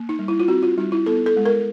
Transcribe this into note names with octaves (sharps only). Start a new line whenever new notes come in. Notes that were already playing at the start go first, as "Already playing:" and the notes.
Already playing: A#3
D#4
G3
E4
F4
C4 F#4
F4
G3 D#4
E4
B3 A4
A4
G#3
A#4